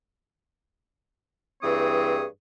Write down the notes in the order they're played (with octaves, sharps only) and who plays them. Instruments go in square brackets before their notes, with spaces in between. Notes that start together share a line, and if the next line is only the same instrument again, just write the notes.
[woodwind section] G2 E3 C4 G#4 C#5 D#6